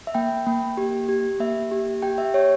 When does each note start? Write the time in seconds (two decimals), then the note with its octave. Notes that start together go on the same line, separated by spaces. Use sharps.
0.07 E5
0.15 A#3 G5
0.47 A#3
0.77 G4
1.09 G4
1.40 A#3 E5
1.71 G4
2.02 G4 G5
2.18 E5
2.34 G4 C#5